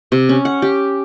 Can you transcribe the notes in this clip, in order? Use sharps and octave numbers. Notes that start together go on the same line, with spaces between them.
C3
C#4
F#5
G4